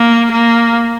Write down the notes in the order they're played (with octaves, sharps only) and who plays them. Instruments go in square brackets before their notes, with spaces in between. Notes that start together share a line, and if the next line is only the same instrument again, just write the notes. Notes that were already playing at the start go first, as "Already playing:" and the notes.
Already playing: [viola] A#3
A#3